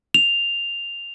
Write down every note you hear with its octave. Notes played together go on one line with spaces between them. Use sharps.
F7